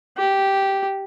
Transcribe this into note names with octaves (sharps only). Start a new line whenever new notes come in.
G4